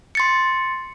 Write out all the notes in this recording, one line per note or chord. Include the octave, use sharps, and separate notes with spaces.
C6 A6 C#7